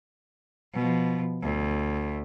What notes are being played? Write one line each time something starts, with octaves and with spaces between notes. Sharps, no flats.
B2 F3
D2